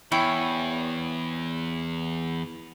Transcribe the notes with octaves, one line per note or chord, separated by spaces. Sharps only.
E2 E4 C#5 G5